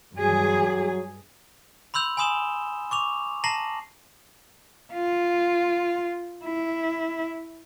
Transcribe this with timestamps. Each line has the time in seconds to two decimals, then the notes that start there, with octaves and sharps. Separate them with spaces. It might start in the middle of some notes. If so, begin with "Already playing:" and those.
0.17 G2 F#3 G#4
1.94 B5 C6 E6 G6 F7
2.17 G#5 B5 C6 D#6 E7 G7
2.91 C#6 D6 F7
3.44 A5 A#5 A#6 C7 F#7
4.93 F4
6.44 E4